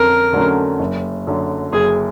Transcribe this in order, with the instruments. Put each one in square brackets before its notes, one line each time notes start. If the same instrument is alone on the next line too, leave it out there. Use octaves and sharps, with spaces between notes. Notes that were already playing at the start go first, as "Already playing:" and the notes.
Already playing: [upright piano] F2 D3 C#4 [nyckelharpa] A#4
[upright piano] D3 F#3 A3 C#4
F#1
F#2 D3
[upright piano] F#1 [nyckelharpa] G#4